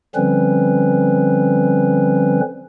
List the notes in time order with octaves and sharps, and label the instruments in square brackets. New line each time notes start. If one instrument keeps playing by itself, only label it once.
[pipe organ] D3 F3 G3 C4 C#4 B4